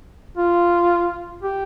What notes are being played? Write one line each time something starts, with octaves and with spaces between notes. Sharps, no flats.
F4
G4